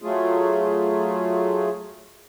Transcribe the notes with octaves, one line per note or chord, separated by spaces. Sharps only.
F#3 A3 F4 G#4